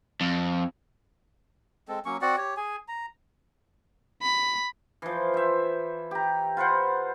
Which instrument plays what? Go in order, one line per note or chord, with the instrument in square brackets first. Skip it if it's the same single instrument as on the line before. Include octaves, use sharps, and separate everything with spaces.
[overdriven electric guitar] F2
[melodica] G#3 C4 A4
F#3 A#3 C#4 C#6
C4 F#4 D5 F#5
G4 C#5
G#4 G#5
A#5
[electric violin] B5
[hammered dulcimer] E3 F3
C5 E5
G4 A#5
F4 B4 C5 F#5